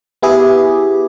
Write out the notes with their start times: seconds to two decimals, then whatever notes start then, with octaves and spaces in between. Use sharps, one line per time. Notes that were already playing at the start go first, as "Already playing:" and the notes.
0.23 B3 E4 G4 G#4